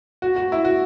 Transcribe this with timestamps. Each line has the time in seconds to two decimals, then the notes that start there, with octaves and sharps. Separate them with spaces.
0.22 F#4
0.36 F#4
0.52 E4
0.65 F#4